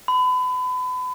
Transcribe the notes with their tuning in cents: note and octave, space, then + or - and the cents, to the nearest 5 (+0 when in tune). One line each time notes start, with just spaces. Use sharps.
B5 +30